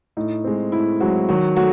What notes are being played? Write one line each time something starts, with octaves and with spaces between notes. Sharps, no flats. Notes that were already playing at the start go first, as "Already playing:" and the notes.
A2 D#4
G#3 C4
A2 E4
F#3 G#3 C4 F#4
D#3 F#3 F#4
F#3 A3 F#4